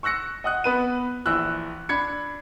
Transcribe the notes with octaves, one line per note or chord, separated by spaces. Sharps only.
C#6 E6 F#6 A#6 C#7
D#5 F#5 D#6 F#6
B3 B4 D#7
A#1 E3 E6 F#6
D4 B5 G#6 C#7